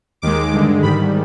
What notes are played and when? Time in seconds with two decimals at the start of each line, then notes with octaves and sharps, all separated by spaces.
0.22 D#2 D#3 G#3 D6
0.53 G2 D3 G#3
0.82 G#2 D#3 G3 B5